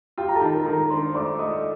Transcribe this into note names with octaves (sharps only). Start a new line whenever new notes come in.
F4 G4 G5
A#5
A4 A5
D#3
A#4 A#5
D#3
A#4 A#5
D4 C5 C6
A3 D5 D6
A3 D#5 D#6